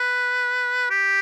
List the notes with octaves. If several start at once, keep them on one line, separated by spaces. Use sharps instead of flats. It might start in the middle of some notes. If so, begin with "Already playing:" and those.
Already playing: B4
G4